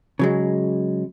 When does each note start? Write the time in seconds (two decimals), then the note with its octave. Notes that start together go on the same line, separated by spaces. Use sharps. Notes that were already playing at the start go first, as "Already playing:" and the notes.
0.19 C#3 F#3 G#3